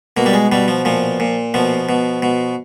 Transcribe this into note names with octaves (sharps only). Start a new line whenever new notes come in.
B2 A#3
G3
G#3
B2 G3
F3
A#2 F3
A#2
B2 F3
B2
B2